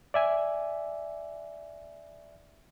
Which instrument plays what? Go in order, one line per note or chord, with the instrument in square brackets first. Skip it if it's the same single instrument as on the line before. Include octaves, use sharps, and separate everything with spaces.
[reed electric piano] D5 E5 G#5